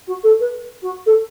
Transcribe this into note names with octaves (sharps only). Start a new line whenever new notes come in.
F#4
A4
B4
F#4
A4